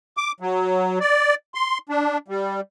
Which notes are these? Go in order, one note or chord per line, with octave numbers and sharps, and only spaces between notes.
D6
F#3
D5
C6
D4
G3